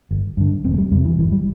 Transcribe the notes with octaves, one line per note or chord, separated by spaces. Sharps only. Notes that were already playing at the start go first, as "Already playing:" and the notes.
G1
G2 D3
E1 C4
A3
G3
E2 C3 G3
E3
G1 E3
G3